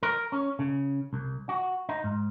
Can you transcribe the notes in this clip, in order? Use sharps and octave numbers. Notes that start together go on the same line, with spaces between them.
A#4
C#4
C#3
C2
F#4
D#4
G#2